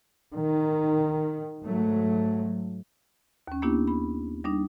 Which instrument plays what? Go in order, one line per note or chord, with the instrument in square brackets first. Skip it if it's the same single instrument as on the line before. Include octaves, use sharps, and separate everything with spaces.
[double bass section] D#3
G#2 F#3 A3
[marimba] D#2 C#4
A#3 B3 D4 E4 G4
B5
G3 D4 D#4